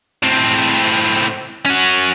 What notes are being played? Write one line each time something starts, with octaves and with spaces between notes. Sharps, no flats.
A2 C4
C#4 F#4